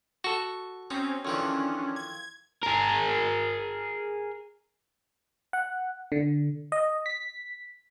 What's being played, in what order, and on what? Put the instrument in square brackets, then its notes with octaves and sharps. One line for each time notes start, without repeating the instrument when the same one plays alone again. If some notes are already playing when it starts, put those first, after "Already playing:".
[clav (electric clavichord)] F#4 A4 [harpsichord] C#6
[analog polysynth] C4 C#4 [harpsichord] D#4
[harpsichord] F2 D#3 E3 [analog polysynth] C#4 D4
[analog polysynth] G#6
[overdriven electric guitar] G#4 A#4
[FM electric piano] F#5
D3
D#5
B6